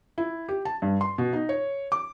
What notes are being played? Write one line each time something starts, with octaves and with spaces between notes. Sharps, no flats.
E4
G4
A5
G2
C6
B2
D#4
C#5
D6